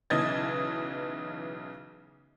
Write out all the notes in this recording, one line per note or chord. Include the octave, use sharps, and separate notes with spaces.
B1 C#3 E3 D#5 G#6 A6